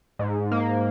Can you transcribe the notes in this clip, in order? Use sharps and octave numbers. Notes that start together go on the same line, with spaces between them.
G#2
A#3